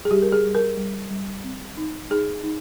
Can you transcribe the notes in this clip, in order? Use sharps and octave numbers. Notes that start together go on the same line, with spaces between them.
G#4
G3 G4
A#4
G#4
G3
A#4
G3
G3
C4
D#4
D#4 G#4
D#4